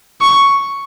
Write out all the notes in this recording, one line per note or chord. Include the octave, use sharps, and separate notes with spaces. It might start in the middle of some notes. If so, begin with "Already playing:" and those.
C#6